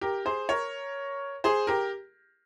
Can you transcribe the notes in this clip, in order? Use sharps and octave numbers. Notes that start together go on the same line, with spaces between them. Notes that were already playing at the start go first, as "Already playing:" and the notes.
G4 A#4
G#4 C5
A#4 C#5
G#4 C5
G4 A#4